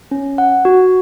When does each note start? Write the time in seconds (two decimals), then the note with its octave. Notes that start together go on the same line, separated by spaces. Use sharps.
0.11 C#4
0.38 F#5
0.65 F#4